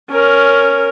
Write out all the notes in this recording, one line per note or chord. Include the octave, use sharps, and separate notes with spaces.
C#4 A#4